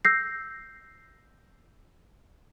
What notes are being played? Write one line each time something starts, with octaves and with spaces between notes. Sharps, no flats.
E6 G6 A#6 C7